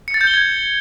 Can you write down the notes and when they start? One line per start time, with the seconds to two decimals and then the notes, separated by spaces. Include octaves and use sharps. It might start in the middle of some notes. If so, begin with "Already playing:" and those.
0.08 C#7
0.14 A6
0.21 G6
0.27 G7
0.34 G#6